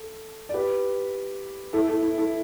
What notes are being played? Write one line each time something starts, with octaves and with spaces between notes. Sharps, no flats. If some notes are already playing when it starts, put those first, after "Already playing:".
Already playing: A4
D5
G4 B4
E4 A4
E4 A4
E4
E4 A4